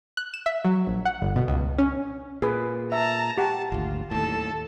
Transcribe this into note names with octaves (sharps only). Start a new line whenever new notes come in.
F#6
E7
E5
F#3
A#1
F#5
G1
B2
C#2
C#4
A#2 G#4 B4
E5 A5 A#5
G4 F#5 A5
G#1 D2 F4
D#2 A2 A4 A5